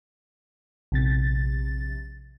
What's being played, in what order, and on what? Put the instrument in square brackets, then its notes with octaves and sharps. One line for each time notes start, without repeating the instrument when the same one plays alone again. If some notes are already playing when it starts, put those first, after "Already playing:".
[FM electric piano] A#1 C3 A6